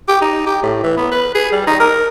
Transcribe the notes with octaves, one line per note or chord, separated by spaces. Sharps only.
G4
D#4
G4
A2
E3
B3
B4
G#4
G3
D#4
A#4